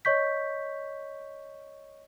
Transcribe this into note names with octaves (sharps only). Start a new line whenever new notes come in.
C#5 D#5 C#6 G6 B6